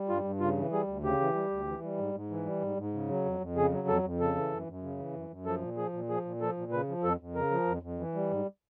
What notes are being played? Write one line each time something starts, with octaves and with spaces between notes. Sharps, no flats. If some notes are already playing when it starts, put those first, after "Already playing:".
Already playing: G3
G2 F4
G2
C#3 F4
E3
G3 G#4
D2
C#3 G4
E3
G3
D2
E3
G3
G#2
G#2
E3
G3
G#2
G#2
C#3
F#3
F2
F2
C#3 G#4
F#3
F2 A4
F2
C#3 A4
E3
F#2
F#2
C#3
E3
F#2
F#2
F3 A4
A#2
F3 G#4
A#2
F3 G#4
A#2
F3 A4
A#2
C#3 B4
F3
F2 A4
F2
C#3 A#4
F3
F2
F2
E3
G3
G#2